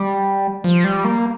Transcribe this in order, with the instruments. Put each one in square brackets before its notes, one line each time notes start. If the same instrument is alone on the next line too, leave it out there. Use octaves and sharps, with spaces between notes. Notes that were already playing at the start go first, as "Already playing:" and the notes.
Already playing: [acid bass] G3
F3
G3
A#3